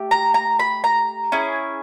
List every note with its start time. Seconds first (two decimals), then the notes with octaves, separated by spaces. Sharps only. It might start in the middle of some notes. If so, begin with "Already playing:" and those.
Already playing: A3 G4
0.11 A#5
0.34 A#5
0.59 B5
0.84 A#5
1.32 C#4 E4 G#4